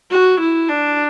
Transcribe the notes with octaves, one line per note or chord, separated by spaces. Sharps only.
F#4
E4
D4